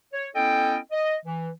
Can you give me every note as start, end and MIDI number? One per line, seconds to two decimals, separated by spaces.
0.13 0.28 73
0.35 0.78 59
0.35 0.78 61
0.35 0.78 64
0.35 0.78 69
0.35 0.78 75
0.35 0.78 79
0.92 1.16 75
1.25 1.50 52